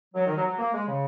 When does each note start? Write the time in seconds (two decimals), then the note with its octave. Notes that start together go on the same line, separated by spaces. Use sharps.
0.15 F#3
0.26 D#3
0.36 F#3
0.47 F#3
0.59 A#3
0.74 G#3
0.88 C#3